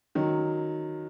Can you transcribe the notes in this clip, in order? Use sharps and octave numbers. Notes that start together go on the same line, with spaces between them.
D#3 F#3